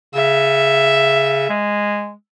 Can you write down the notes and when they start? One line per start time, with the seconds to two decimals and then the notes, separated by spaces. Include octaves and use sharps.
0.14 C#3 E5
1.49 G#3